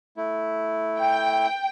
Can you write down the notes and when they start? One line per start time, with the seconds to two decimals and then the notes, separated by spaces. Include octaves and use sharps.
0.17 A3 E4
1.00 G5